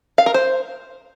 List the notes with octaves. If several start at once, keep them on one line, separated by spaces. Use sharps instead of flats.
F5
A#4
C5